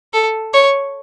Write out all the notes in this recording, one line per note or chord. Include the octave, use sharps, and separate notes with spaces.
A4
C#5